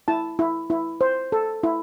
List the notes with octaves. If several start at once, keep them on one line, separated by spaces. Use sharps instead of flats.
E4 A5
E4
E4
C5
A4
E4